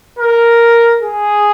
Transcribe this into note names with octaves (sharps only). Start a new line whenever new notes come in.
A#4
G#4